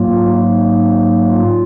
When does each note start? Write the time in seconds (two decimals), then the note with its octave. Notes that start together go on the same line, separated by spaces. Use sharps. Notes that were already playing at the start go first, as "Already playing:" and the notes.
Already playing: G#2 F#3 A#3 F4
0.27 D#4
1.31 F4